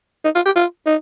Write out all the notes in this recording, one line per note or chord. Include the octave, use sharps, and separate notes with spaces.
D#4
F4
G4
F4
D#4